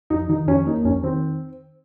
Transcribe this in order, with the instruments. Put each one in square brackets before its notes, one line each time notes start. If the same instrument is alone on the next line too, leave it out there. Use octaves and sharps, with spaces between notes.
[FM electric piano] F2 [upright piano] D#4
[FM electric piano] D#3 [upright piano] D#4
[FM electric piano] F2 [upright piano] C#4
[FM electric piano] A#3 [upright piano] D#4
[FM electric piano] F2 [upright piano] C#4
[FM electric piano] D#3 [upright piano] C4